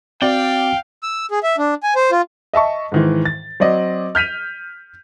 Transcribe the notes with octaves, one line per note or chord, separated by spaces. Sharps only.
C4 F#4 D5 F5 G5
E6
G#4
E5
D4
G#5
C5
F4
D#5 E5 A5 C#6
G#2 D#3 E3
A6
F#3 C4 D5 D#5
F6 G6 B6 D#7 F7